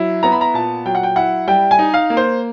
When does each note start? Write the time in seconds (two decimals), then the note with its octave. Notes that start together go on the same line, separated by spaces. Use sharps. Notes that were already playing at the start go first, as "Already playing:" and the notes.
Already playing: F#3 E4
0.23 B3 A#5
0.32 B5
0.41 A#5
0.54 A#2 A5
0.86 F#3 G5
0.95 F#5
1.03 G5
1.16 E4 F#5
1.47 G3 G5
1.71 G#5
1.79 D#4
1.94 F5
2.10 A#3
2.17 C5